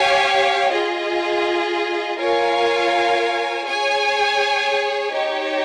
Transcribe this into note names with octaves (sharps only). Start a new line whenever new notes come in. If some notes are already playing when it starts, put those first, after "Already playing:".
Already playing: G4 C#5 F5 G#5
F4 G#4 D#5
F4 A#4 C#5 F5 G#5
G#4 C#5 G#5
D#4 G4 C#5